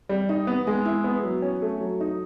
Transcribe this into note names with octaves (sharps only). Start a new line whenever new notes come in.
G3
D#4
B3
G#3
E4
B3
F#3
C#4
A3
F#3
D#4